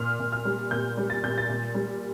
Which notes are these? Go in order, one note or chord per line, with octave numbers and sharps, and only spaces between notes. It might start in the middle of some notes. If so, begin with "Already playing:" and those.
Already playing: A#2 F6
A#2
F6
G3
A#2 G6
G3
A6
A#2 G6
A6
A#2
G3